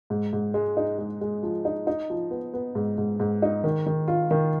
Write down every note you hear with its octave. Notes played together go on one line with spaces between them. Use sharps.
G#2
G#2
G#3
D#4
G#3
G#3
F3
D#4
D#4
F3
B3
B3
G#2
G#2
G#2
D#4
D#3
D#3
F4
D#3